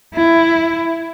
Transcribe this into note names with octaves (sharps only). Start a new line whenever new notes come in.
E4